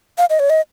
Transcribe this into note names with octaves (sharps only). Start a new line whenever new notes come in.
F5
D#5
C#5
D#5